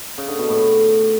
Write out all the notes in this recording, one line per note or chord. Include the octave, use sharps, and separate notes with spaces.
C#3
D3
B2
A2